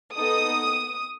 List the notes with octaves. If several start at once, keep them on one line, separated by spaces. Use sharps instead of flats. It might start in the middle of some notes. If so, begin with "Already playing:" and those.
B3 D#4 A4 D#6